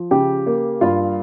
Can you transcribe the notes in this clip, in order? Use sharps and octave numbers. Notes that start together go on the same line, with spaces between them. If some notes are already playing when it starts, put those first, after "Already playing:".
Already playing: F3
C#3 G4 G5
A#3
G2 F4 F5